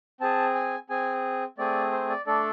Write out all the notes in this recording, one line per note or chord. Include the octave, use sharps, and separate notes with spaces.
C4 G#4 A5
G#5
C4 G#4 G#5
A3 C4 G#4 D5
C5
D5
A3 D4 A4 D5